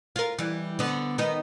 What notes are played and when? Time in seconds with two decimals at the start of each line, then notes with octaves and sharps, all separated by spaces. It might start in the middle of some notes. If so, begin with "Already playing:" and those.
0.16 F4 A#4
0.38 E3 G3
0.79 D3 B3
1.18 D#3 B3 D#4